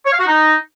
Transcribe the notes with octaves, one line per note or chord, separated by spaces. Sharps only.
C#5
F5
F#4
D#4